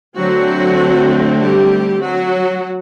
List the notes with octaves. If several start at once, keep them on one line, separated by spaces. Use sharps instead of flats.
D3 F#3 A3 C4 F#4
G3 G4
F#3 F#4